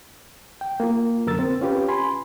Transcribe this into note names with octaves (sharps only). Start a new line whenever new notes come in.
G5
A#3 F4
F#2 D3 A#4 E6 A6
C4
C#4 F4 G4 B4
G#5 B5 C6